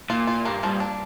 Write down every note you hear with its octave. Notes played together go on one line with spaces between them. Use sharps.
A#2 F4
F4
G2 A#3
G2 F3
D4